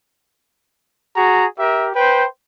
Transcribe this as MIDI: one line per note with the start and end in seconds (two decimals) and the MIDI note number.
1.17 1.45 66
1.17 1.45 68
1.17 1.45 82
1.59 1.89 67
1.59 1.89 70
1.59 1.89 76
1.95 2.26 71
1.95 2.26 72
1.95 2.26 79